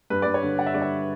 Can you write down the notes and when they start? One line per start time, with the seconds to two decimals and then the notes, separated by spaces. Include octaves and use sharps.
0.10 G2 B4
0.22 G2 D5
0.34 C#5
0.43 D3
0.58 D3 F#5
0.67 E5
0.74 G2 D5
0.82 E5